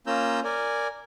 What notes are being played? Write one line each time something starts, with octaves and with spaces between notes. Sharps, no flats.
A#3 C#4 F4 A#5 E6 G6
A#4 D5 G#5